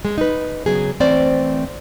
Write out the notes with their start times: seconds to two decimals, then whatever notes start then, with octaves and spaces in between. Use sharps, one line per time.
0.05 G#3
0.18 D#4 B4
0.66 C#3 F#3 B3 G#4
1.00 E3 A3 C4 C5 D5